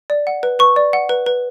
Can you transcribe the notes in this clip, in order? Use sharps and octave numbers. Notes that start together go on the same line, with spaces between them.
D5
F#5
B4
B4 C#6
D5
F#5
B4
B4